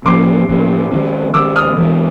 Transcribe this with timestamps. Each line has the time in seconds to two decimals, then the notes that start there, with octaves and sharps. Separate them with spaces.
0.05 A2 F3 A#3 C#4 C6 D6
0.49 A2 F3 A#3 C#4
0.91 D#3 G#3 C#4
1.34 D#3 G#3 C#4 D6 E6
1.56 D#6 F6
1.77 E3 G#3 B3 D4